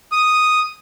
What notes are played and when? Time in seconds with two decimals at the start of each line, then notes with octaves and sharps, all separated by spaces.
0.12 D#6